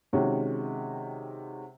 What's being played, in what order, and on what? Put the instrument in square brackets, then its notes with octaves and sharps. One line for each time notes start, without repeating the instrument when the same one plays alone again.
[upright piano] C3 D#3 G#3 C#4 F#4